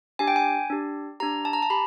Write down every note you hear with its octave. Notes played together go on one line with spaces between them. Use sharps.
D4 G4 G#5
G5
G#5
D4 G4
D4 G4 A#5
A5
A#5
A5
G4 B5